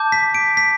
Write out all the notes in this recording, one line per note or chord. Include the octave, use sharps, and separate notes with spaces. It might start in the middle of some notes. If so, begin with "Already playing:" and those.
Already playing: A5 D6 G6
B6
D7
B6